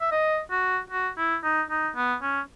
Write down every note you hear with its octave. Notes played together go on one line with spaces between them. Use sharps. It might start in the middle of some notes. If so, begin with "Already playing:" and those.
E5
D#5
F#4
F#4
E4
D#4
D#4
B3
C#4